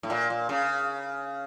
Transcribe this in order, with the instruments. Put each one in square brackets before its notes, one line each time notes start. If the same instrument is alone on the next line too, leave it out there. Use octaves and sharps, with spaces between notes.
[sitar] A2
A#2
A#2
C#3